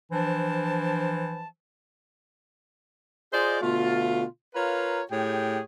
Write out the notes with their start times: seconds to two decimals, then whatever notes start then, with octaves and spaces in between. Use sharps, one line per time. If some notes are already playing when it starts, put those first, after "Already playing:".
0.12 E3 F3 D4 C5 A5
3.33 F4 G#4 C5 D5 D#5
3.62 B2 D3 A3 F4
4.55 F4 A#4 B4 C#5 F5 A#5
5.11 A2 G4 G#4 C#5 G5